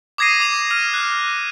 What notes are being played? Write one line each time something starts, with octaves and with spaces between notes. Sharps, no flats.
D6 D#6 G#6 A#6 C7 D#7
D6 F7
F6 D#7 F7
F6 F#6